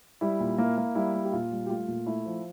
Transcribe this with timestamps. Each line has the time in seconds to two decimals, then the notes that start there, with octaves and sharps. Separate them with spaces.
0.21 G3 E4
0.40 A#2
0.58 A#3 E4
0.78 A#3
0.95 G3 E4
1.15 A#3
1.24 G4
1.33 A#2 F4
1.52 G3
1.66 G4
1.70 A3 F4
1.88 A#2
2.06 A3 E4
2.26 F3